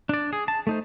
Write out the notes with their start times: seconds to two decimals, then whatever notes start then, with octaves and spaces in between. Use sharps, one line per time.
0.09 D4 D5
0.33 G#4
0.48 A5
0.67 A3 D#4 C5